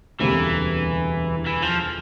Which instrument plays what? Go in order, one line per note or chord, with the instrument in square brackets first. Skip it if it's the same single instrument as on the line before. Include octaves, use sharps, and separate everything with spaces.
[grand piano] E1 D2 C3 G3 A#3 [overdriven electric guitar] E3
[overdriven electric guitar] E3
F3